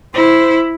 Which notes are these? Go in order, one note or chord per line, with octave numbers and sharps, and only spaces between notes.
E4 C5